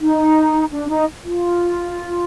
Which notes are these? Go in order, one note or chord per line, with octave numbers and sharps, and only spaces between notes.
D#4
D4
D#4
F4